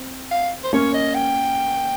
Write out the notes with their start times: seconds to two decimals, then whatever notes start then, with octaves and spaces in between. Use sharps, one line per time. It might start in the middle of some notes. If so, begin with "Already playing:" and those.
Already playing: C4
0.31 F5
0.64 C5
0.73 A#3 C#4 C#5
0.94 D#5
1.14 G5